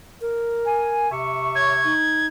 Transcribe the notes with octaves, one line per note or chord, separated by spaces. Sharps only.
A#4
G#5
C3 E5 C#6
C#5 G#6
D#4